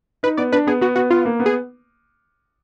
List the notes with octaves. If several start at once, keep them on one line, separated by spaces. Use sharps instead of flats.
D#4 B4
B3 D5
D4 B4
B3 G#4
B3 F#4
B3 F#4
B3 F4
A#3
B3
G#4